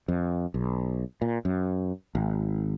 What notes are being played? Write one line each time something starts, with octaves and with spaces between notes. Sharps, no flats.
F2
B1
A#2
F#2
G#1